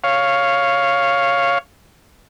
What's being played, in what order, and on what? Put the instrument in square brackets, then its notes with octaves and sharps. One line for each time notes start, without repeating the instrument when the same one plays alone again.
[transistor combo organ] C#5 F5